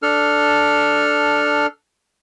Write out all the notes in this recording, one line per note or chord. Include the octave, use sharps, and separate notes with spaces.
D4 A4 F6